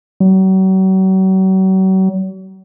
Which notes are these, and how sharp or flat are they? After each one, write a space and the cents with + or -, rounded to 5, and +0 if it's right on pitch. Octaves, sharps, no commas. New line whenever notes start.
F#3 +40